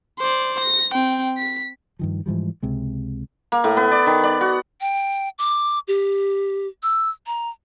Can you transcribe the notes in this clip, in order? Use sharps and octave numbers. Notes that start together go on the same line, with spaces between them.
C5 D5
A#6
C4 G5
B6
G2 D#3 F3
G#2 E3 F3 G3
C#2 C3 G#3
A#3
A2
B3
D5
D#3
D5
F#4
G5
D6
G4
E6
A#5